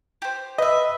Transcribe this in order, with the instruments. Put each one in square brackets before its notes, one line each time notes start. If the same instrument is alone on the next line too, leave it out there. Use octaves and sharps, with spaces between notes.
[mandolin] G4 C5
[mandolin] B4 E5 [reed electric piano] D#5